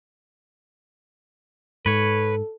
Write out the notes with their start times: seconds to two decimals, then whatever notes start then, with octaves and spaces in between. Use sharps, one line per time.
1.86 G#2 A4 B4 C#5